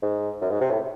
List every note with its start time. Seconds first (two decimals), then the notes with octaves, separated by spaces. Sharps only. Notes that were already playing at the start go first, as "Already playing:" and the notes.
0.02 G#2
0.41 F#2
0.51 G#2
0.61 C3
0.71 A2